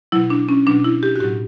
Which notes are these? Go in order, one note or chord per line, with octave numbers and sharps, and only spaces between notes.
B2 F#3 E4
D4
C#4
B2 F#3 D4
E4
G4
F#4
A2 F#3 G4